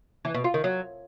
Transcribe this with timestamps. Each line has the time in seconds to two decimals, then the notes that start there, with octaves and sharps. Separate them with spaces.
0.25 E3
0.34 B2
0.44 F4
0.54 D#3
0.64 F#3